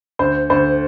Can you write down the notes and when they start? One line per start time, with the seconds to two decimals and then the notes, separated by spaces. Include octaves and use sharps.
0.19 D2 C5
0.50 D2 C5